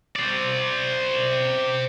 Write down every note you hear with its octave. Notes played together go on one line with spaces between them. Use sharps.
C5 D5